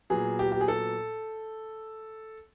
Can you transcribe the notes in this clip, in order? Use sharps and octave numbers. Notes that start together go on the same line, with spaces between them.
A#2 F#3 B3 G#4
G4
G4
G#4
A4